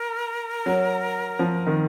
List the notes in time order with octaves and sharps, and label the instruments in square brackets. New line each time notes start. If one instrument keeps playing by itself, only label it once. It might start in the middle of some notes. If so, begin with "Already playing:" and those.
Already playing: [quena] A#4
[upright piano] F#3
F3
D#3